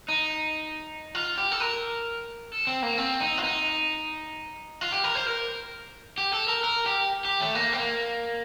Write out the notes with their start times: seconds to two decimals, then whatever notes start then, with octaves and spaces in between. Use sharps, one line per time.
0.08 D#4
1.15 F4
1.38 G4
1.52 A4
1.60 A#4
2.52 A4
2.67 C4
2.83 A#3
2.98 C4
3.20 D#4
3.37 F4
3.43 D#4
4.81 F4
4.92 G4
5.04 A#4
5.15 C5
5.26 A#4
6.18 G4
6.33 A4
6.48 A#4
6.64 A#4
6.86 G4
7.25 G4
7.40 A3
7.55 A#3
7.73 C4
7.78 A#3